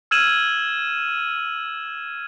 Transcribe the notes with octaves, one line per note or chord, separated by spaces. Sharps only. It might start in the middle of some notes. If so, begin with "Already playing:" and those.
E6 F6 G#6 D#7 E7 F#7